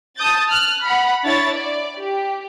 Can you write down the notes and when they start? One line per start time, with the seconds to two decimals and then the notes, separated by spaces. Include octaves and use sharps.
0.16 A5 D#6 G6 A6
0.48 F6 F#6
0.82 F#5 B5
1.24 D4 E4 C#5 A6
1.53 D5
1.97 G4